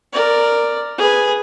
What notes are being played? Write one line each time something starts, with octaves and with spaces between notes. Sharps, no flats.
A#4 D5
G#4 B4